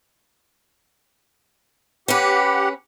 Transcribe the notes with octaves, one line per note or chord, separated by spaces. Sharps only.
C#4 G4 B4 F#5